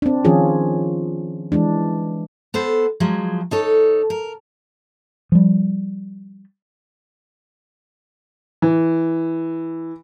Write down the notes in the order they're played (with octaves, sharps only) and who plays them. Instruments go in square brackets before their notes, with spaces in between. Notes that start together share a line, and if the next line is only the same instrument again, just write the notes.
[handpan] C4 D4
D#3 F3 C#4 F4 G#4
E3 G#3 D4
[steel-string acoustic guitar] B3 A4 C5
F3 F#3 G#3
D#4 A4 C#5
A#4
[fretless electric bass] F3 G3
[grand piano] E3